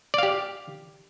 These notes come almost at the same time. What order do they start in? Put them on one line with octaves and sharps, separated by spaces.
D5 F5 G4